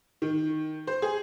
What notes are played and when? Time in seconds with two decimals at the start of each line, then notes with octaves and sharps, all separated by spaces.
0.22 D#3
0.87 C5
1.02 G#4